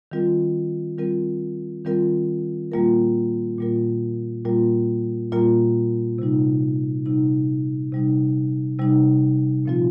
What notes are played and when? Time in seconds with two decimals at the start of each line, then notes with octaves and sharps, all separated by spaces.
0.12 D#3 G3 C4 F4 A#4
0.98 D#3 G3 C4 F4 A#4
1.85 D#3 G3 C4 F4 A#4
2.72 A#2 G3 A#3 F4 A#4
3.58 A#2 G3 A#3 F4 A#4
4.45 A#2 G3 A#3 F4 A#4
5.32 A#2 G3 A#3 F4 A#4
6.19 C3 G3 D#4
7.06 C3 G3 D#4
7.92 C3 G3 D#4
8.79 C3 G3 D#4
9.65 A#2 F3 C4 F4